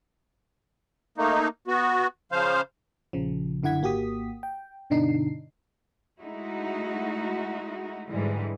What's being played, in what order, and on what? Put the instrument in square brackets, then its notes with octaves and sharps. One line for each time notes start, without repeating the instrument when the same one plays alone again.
[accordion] A3 A#3 D#4
B3 F#4
C#3 F3 C5 F5
[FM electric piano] A#1 C#3 F3
F#2 D3 E4 F#5 G#6 B6
G#1 A#3 F#4 G4 D#6 B6
G5
G2 B2 D3 D4 D#4 C7
[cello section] G#3 A3 D#4 E4 F#4
G#2 D3 E3 G3 G#3